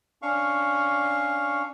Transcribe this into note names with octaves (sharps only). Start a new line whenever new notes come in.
C#4 D4 F5 C#6